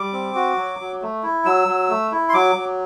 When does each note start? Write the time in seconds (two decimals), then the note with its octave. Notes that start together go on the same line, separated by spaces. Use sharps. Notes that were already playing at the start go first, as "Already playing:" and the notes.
Already playing: G3 D6
0.13 C4
0.35 F#4
0.57 F#3
0.79 F#3
1.02 A3
1.23 E4
1.45 F#3 E6
1.68 F#3
1.89 A3
2.12 E4
2.29 C6
2.33 F#3 D6
2.56 F#3